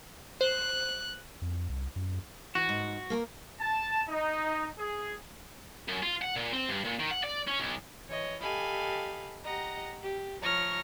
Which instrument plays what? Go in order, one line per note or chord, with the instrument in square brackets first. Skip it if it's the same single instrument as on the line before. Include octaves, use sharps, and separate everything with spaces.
[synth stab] C5 [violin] F#6
[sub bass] F2
C2
F#2
[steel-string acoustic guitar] E3 [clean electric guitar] F#4
[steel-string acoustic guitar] G#2
A#3 A4 A#4
[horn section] A5
D#4
G#4
[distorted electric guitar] F#2
F4
F#5
A#2
C4
G2
A#2
D#3
F#5
D5
C#4
B1
[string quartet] E3 C#5 D#5
G4 A4 D#5 F5 G#5 B5
G4 D#5 F#5 A#5
G4
F3 C#5 A#5 C#6 F6 A#6